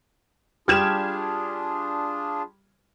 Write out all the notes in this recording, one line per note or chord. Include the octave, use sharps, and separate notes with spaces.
G3 D4 F4 G4 G#4 F6 G#6 E7